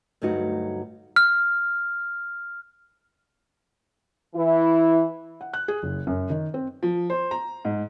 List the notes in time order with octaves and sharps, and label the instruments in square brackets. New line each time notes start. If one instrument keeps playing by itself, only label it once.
[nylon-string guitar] D2 G2 F#3 A3 D#4 F#4
[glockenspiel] F6
[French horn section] E3 E4
[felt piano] F#5
F#6
G#4
F#1
F#2
D#3
C4
[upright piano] F3
C5
A#5
G#2